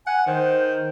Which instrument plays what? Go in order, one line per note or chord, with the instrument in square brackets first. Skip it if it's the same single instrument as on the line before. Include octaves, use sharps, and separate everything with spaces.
[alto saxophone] F#5 [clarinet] G#5
[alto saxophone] D#3 [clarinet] C5